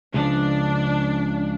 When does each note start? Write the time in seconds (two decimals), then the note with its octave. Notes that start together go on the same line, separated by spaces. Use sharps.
0.14 C#2 C#3 F3 D4